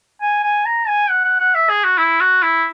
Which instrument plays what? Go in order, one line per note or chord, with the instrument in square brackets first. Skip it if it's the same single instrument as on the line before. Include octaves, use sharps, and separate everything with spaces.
[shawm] G#5
G#5
A#5
G#5
F#5
F#5
F#5
E5
G#4
F#4
E4
F#4
E4